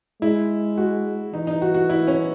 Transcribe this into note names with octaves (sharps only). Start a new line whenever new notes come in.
G#3 E4
F#4
E3 D#4
D#4
F#4
F#4
E4
C#4